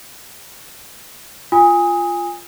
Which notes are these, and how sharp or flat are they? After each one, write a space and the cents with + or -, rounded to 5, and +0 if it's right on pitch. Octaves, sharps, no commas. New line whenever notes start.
F4 -5 G#5 -20 D#6 +20